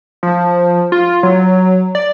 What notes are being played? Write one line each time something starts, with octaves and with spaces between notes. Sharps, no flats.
F3
F4
F#3
D5